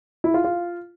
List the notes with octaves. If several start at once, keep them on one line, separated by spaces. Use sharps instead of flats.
E4
F4
F4